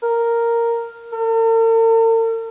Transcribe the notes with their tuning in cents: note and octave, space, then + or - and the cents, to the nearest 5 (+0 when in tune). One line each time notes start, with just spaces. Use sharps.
A#4 -5
A#4 -45